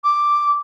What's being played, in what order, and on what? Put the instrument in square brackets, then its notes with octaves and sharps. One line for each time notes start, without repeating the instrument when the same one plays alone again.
[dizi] D6